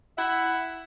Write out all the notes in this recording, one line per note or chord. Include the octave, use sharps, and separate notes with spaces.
E4 E5 F#5